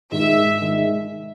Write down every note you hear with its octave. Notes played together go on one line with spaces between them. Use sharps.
G#2 D#3 G#3 E5
D#3 G#3